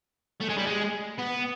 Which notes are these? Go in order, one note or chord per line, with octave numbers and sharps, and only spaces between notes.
A3
G#3
G3
G#3
B3